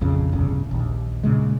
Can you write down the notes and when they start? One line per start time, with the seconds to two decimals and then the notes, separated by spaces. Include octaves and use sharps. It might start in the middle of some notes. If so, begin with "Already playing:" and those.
0.01 A#1 F2 C#3
0.32 D1 G1 C2 C#3
0.71 A#1 D#2
1.23 A#2 C#3 G#3